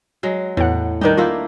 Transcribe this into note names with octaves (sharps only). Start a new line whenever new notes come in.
F#3 G#3
E2 A2 F#5
D#3 G3 D4 D#4 A#4
A3 A#3 E4 F4